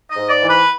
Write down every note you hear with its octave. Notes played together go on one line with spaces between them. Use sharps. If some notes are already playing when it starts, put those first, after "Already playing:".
D#5
G#2
D5
E3
B4